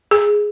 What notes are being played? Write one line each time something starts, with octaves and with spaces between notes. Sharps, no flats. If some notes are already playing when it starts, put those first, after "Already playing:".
G#4